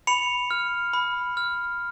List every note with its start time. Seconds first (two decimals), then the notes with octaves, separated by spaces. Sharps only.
0.07 B5 C#7 F7
0.51 F6
0.93 B5
1.37 F6